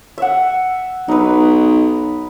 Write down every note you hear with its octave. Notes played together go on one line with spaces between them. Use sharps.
E5 F#5
B1 D#4 B4